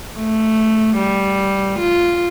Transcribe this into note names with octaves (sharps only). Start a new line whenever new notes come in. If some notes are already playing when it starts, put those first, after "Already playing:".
A3
G3
F4